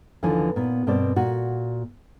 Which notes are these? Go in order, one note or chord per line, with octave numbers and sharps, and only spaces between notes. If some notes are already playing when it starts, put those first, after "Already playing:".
D#2 D3 E3 F3 G#5
A#2 B3
G2 B2 C4 A#4 D5
A#2 F#4